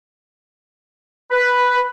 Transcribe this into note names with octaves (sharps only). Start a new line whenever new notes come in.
B4